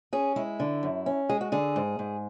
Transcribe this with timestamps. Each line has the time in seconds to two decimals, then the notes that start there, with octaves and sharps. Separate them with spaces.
0.13 C#4 G#4
0.36 G#3 E4
0.60 D3
0.83 F#2
1.06 C#4
1.29 G#3 G#4
1.41 F#4
1.52 D3 G#4
1.76 G#2
1.99 G#2